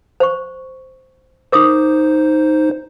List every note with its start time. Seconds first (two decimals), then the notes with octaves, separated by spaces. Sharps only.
0.20 C5 C#6
1.52 D#4 A#4 C5 D6 D#6